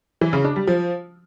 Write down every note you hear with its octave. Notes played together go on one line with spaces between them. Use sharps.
E3
C#3
D4
G3
F3